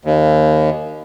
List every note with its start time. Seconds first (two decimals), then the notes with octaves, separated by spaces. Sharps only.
0.05 D#2